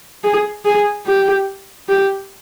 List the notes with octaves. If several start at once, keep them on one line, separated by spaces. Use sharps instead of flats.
G#4
G#4
G4
G4